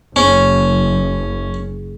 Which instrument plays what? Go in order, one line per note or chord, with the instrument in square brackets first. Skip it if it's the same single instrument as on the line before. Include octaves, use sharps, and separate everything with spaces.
[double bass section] F#1 [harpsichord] C#4 [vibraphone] G#4